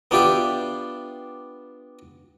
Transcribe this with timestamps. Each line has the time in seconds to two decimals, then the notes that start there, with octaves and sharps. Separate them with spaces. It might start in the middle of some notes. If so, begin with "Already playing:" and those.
0.11 B3 D4 F4 G4 D5 E5